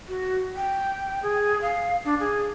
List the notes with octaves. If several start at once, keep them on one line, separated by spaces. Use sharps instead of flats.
F#4
G5
G#4
F5
D4
G#4